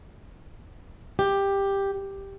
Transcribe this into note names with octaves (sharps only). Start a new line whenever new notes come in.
G4